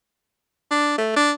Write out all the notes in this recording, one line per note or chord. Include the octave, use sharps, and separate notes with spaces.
D4
A3
D4